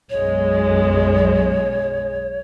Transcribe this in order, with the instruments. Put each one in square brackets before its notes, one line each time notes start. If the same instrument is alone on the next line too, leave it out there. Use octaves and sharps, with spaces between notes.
[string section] B1 F#2 G#3 [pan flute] C#5